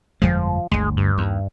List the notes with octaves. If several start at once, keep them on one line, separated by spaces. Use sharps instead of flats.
G1 F2 F3 G#3
G1 D2 G#3
G2
D#2